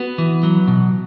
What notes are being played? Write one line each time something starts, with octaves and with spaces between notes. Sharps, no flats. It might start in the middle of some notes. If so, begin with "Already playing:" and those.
Already playing: B3 F#4 B4
E3
F#3
B2